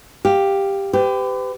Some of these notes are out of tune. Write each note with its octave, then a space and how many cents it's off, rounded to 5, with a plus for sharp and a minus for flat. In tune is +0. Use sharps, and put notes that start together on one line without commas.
G4 +5 F5 +0
G4 +0 B4 +40